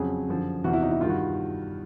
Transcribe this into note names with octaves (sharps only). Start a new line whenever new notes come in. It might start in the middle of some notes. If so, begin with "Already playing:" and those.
Already playing: F2 C#3 F#3 G#4
F#2 D3 F3
E2 C3 E3 F#4
E4
D#4
E4
G2 D#3 G3 F4
F#4